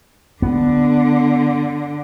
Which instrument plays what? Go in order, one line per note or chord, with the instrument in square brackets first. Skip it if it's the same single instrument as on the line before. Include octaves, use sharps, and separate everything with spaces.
[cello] D3 [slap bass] B3